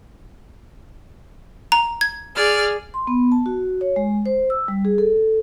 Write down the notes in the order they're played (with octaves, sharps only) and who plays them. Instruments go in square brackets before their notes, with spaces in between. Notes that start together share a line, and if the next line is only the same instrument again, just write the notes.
[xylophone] A#5
G#6
[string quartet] G#4 D5 F6
[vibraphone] C6
B3
A5
F#4
C#5
G#3
C5
E6
G3
G#4
A4